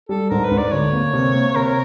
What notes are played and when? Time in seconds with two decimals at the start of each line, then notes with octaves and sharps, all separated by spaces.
0.09 G3 A4
0.30 G#2 A#4
0.44 B4
0.51 G#2
0.58 D5
0.72 D2 C#5
0.93 A#3
1.13 C3
1.35 A#3
1.56 C3 A#4